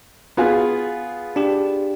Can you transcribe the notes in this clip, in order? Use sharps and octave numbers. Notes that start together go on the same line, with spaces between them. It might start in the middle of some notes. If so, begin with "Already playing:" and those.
B3 F4 G#4
D4 G4